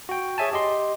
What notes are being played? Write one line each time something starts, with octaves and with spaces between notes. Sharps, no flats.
F#4 G5
G#4 C#5 E5 G#5 A5
G4 D#5 C6